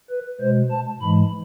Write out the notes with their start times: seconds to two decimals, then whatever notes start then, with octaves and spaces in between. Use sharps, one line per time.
0.10 B4
0.40 B2 G#3 C5
0.71 A5
1.01 G#2 E3 G#3 B5